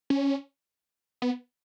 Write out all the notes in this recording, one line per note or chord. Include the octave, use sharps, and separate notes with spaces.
C#4
B3